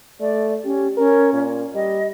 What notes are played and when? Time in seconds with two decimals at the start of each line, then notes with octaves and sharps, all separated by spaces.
0.20 A3 D5
0.65 C#4 G4
0.97 C#4 A#4
1.33 A#2
1.75 G3 D#5